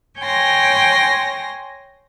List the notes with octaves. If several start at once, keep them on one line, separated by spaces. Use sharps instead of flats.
C#5 G5 G#5 C6 A#6